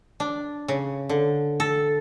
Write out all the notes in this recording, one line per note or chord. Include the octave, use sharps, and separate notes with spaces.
D4
C#3
D3
A4